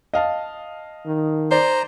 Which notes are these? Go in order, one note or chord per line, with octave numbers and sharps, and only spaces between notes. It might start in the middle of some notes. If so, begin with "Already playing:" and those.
D#5 F5 A5
D#3
C5 D5 A#5